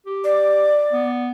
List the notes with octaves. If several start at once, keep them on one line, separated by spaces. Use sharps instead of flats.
G4
D5
B3